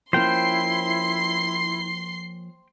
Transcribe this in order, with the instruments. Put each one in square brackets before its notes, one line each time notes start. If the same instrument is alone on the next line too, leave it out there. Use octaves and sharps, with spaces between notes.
[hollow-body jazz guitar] F3 A#3 C#4 [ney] E4 [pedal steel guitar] C5 G5 [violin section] C6 C7